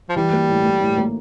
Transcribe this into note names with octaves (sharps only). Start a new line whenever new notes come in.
F3
E3 G3
A#3
A2
A#3
A2
A#3